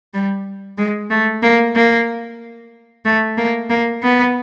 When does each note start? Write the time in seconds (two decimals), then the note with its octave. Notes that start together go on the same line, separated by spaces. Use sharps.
0.14 G3
0.78 G#3
1.10 A3
1.42 A#3
1.75 A#3
3.05 A3
3.38 A#3
3.70 A#3
4.03 B3